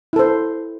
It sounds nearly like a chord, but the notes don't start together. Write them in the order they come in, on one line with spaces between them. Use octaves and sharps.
E4 A4 C5